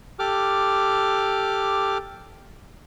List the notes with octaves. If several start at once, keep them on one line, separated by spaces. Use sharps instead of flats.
G4 A4 D6 F6